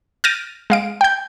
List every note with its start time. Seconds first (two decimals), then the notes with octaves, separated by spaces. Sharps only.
0.24 F6 G6 A6 A#6 D7 D#7
0.70 G#3 F5 D7
1.01 G5 G6